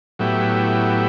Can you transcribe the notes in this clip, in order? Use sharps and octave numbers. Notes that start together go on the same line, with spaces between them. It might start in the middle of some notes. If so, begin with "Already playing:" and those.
A2 F#3 B3 E4 G4